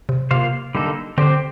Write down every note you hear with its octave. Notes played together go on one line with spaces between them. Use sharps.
C3
C3 A#3 F4 C5 F5
D3 G3 A#3 D#4 A4
D3 C4 G4 C5